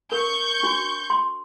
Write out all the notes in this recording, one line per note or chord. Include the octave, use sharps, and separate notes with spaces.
A#4 C#6 G6
D4 F#4
C6